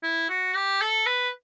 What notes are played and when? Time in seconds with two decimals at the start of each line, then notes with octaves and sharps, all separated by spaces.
0.03 E4
0.29 F#4
0.55 G4
0.81 A4
1.06 B4